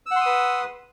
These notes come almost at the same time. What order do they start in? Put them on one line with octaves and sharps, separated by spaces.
E6 F#5 C6 D#6 B4